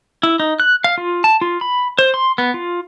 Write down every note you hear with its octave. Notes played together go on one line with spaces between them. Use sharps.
E4
D#4
F#6
F5
F4
A5
F4
B5
C5
C6
B3
F4